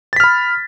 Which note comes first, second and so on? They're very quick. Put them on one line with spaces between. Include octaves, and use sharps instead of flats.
A6 B6 F6 B5